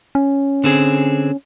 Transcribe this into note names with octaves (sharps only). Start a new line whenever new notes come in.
C#4
D3 C4 G#4